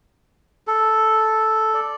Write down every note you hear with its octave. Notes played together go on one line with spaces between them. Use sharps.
A4
D5